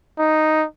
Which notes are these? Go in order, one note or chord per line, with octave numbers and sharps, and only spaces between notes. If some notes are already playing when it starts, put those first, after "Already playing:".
D#4